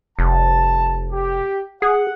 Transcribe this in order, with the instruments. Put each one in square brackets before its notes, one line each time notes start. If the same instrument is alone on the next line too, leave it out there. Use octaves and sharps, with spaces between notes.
[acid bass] F1 [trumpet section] A5
[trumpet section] G4
[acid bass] G#4 [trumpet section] F#5